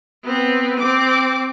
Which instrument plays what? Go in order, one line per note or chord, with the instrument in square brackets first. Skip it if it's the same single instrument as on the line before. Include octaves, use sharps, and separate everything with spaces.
[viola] B3 C4
C4 D6